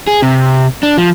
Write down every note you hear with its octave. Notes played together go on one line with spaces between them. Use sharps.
G#4
C3
D4
F3